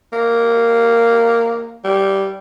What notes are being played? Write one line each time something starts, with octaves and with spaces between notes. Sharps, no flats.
A#3
G3